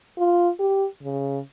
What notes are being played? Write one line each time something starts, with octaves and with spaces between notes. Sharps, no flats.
F4
G4
C#3